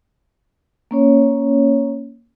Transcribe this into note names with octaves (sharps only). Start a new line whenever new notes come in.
A#3 C#4 C#5